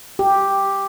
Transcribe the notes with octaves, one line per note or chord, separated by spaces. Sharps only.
G4